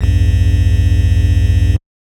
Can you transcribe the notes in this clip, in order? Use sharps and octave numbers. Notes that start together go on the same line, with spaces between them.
A#1 E2 G2